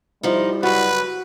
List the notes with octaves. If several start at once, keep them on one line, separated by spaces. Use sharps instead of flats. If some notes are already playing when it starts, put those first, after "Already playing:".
F3 G3 D#4 E4
F#2 C#3 F#4 B4